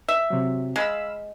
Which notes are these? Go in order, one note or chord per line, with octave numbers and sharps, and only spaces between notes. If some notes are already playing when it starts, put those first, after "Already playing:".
E5
C3 F#3
G#3 F5 B5 E6